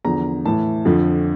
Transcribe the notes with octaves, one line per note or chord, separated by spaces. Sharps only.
E2 D3 F3 A#5
A2 E3 A5
F2 D3 F3